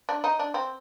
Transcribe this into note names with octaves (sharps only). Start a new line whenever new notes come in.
D4
D#4
D4
C4